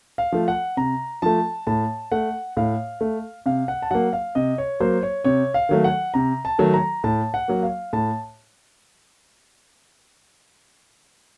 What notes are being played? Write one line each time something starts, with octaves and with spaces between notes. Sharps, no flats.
F5
F3 A3
F#5
C3 A#5
F3 A3 A5
A2 A5
A3 F#5
A2 F5
A3
C3 F5
F#5
A5
F#3 A#3 F#5
F5
C3 D#5
C#5
F#3 A#3 C5
C#5
C3 C#5
F5
D#3 F#3 A3
F#5
C3 A#5
A5
D#3 F#3 A3
A#5
A2 A5
F#5
F#3 A#3
F5
A2 A5